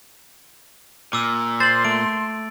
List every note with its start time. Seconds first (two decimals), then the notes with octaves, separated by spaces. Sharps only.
1.13 A#2 D6 E6
1.60 C5 C6 A6 F#7
1.85 A3 D7